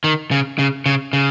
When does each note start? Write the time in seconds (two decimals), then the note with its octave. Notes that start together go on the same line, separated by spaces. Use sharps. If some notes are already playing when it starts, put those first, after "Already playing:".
0.04 D#3
0.31 C#3
0.59 C#3
0.86 C#3
1.13 C#3